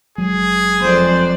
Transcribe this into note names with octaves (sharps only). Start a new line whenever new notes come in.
F#1 F#3 G#3 G#4
F2 C5 D5